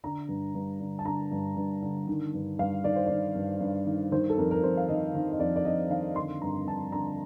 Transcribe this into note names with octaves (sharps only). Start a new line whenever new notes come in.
D3 A#5
G2
G2
D3
A5
D3 A#5
G2
G2
D3
D#3
G2
G2 F5
D#3 D5
C5
D#3 D5
G2
G2
D#3
D#3 C5
A4
F2 A#4
A#4
F2 C5
F5
D#3 D#5
D#3
D#5
F2 D5
D5
F2 D#5
D#3 F5
D3 C6
G2 A#5
G2 A5
D3 A#5